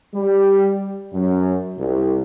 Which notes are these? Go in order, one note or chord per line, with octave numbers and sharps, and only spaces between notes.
G3
F#2
C2